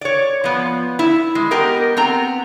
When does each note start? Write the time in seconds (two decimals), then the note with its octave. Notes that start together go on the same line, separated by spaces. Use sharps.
0.01 C#5 D5
0.44 F3 B3
0.99 E4
1.35 G#3
1.51 B3 G4 A#4 D#5
1.97 B3 C4 A#5